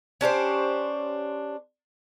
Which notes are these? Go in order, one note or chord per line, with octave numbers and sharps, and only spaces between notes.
C#4 D4 G4 C5